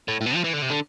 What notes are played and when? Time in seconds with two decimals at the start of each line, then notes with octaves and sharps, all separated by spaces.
0.08 A2
0.21 A2
0.26 B2
0.35 F3
0.44 E3
0.53 D3
0.62 C3
0.70 D3